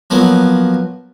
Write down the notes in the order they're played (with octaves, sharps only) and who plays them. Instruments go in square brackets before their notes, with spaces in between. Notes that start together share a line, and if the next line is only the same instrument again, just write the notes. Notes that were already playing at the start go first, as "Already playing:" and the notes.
[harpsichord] F3 F#3 A#3 B3